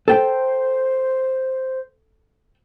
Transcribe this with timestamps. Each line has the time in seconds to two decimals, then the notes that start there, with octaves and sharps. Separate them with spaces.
0.08 A4 C5 G5